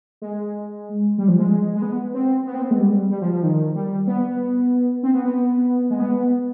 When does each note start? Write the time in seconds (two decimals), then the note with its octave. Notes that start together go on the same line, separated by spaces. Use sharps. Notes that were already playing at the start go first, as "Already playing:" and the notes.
0.22 G#3
1.18 G3
1.28 F3
1.39 G#3
1.75 G#3
1.82 B3
2.14 C4
2.47 B3
2.54 C4
2.62 B3
2.71 G#3
2.79 G3
3.11 G3
3.22 F3
3.33 F3
3.43 D#3
3.75 G3
4.07 B3
5.03 C4
5.14 B3
5.25 B3
5.90 G#3
6.00 B3